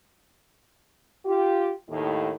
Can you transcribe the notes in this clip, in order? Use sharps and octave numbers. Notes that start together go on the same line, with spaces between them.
F4 G4
D#2 A2